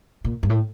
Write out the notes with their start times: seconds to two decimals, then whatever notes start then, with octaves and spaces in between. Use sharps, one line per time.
0.25 A#2
0.43 G2
0.50 A2